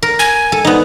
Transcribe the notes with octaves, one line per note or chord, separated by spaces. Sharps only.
A#4
G#5
A4
B3 D#4